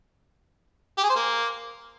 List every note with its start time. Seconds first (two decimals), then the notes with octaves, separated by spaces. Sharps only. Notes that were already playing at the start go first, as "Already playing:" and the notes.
0.98 G4
1.04 G#4
1.10 C5
1.16 A#3